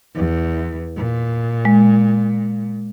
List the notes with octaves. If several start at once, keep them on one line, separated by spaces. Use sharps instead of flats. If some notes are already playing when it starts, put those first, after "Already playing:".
E2
A#2
G#3